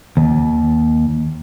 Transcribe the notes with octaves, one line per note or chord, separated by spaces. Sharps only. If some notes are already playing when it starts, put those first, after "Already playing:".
D#2